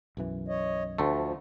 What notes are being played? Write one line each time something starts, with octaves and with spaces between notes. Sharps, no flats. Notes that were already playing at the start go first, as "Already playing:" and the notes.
B1 F#2 E3
C#5 D#5
D2 F3 A3